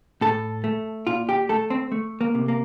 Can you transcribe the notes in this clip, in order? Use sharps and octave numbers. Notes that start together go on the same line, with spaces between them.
A2 A4
A3
A#2 F4
G4
A3 A4
C4
A3
A#3
C3
A#3